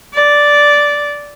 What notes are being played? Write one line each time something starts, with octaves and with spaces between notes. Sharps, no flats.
D5